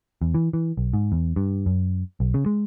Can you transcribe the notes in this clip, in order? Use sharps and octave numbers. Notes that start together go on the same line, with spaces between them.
E2
E3
E3
B1
G#2
E2
G2
F#2
B1
C#3
G#3